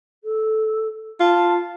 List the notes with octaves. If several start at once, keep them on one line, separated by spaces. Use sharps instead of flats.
A4
F4 A5